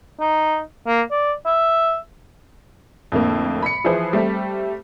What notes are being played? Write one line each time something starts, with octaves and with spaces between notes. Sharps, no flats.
D#4
A#3
D5
E5
F2 A2 D3 A#3
B5 C#7
E3 F3 E4 G#4 B4 C5
G3 A3 C4 G4